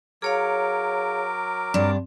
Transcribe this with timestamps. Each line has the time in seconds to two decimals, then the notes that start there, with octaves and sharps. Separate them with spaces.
0.22 F#3 G#4 A#4 C#5 F5 D6
1.74 G2 C4 D4